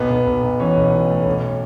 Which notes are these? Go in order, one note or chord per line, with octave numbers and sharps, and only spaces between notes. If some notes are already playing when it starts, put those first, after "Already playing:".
Already playing: B1 B3
B1
B1
B1
E3 C#4
B1
B1
A2
B1